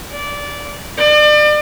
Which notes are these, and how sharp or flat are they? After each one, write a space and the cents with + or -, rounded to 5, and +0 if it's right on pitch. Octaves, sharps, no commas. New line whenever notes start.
D5 -20
D5 +35